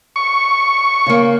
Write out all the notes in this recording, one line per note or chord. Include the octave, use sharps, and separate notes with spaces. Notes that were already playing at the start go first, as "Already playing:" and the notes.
C#6
C#3 A#3